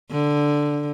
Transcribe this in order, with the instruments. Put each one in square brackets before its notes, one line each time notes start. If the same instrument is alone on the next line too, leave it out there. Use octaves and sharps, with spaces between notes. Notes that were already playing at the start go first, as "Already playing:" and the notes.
[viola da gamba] D3